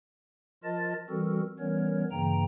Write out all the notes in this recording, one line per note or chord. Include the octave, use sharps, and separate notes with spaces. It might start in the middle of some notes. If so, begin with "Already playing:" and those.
F3 F4 A#4 D#5 A5 A6
E3 G3 C4 F#4 A4 A#4
E3 G3 B3 C#4 A#4 C#5
G2 C#3 E3 A#3 G5 A#5